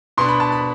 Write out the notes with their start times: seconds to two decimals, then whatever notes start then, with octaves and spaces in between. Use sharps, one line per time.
0.18 B2 B3 D4 C6
0.28 B5
0.40 A5
0.52 B5